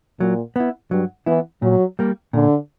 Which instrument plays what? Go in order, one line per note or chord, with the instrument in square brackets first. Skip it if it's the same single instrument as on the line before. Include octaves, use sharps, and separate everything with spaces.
[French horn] A#2 [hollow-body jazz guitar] F#3
[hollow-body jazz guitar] B3 E4
[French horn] G2 [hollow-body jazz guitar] F#3
[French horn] E3 [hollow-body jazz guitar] B3 E4
[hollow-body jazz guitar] A#2 [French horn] F#3
[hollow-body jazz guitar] G3 A#3
[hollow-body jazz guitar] A#2 [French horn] D3